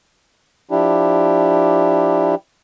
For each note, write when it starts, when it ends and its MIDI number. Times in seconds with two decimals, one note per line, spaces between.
0.71 2.35 53
0.71 2.35 62
0.71 2.35 64
0.71 2.35 67